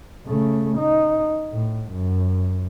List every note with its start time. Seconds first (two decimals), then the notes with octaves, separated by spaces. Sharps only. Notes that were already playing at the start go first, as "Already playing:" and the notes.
0.26 C#3 A3
0.78 D#4
1.52 A2
1.91 F#2